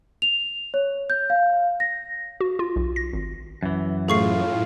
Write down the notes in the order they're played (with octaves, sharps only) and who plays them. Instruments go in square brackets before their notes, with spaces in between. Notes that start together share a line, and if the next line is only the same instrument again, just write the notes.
[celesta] F7
C#5
G6
F5
A#6
[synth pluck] F#4
F4
B1
A#6
G#1
[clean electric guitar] F#2 E3
[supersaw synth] A2 [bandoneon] F4 [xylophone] G#4 C#6 C7